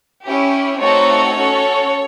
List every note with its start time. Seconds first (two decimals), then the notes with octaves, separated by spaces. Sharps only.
0.23 C#4 E4 G4
0.78 A3 C4 D#4 F#4 A4 C#5
1.34 C#4 F#4 A4